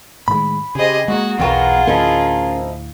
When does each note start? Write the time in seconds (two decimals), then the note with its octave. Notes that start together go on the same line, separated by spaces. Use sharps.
0.28 A2 D#3 G#3 B5
0.75 C#3 G4 G#4 C5 D#5
1.08 G#3 A#3 D#4 F4 F#4 G#4
1.40 B1 E2 B3 F4 F#4 G#4 A#4 G5
1.87 D2 A2 F3 C#4 D#4 E4 A#4